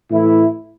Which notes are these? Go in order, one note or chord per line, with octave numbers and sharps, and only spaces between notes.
A2 E3 A3 E4